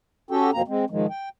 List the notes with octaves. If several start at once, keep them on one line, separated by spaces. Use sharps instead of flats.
C#4 F#4 G4 A4 G5
F2 B2 A#3 C4 A#5
G#3 C4
G#2 D#3 F3 G#3
G5